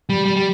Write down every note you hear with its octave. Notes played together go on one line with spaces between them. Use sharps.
G3
G3
G3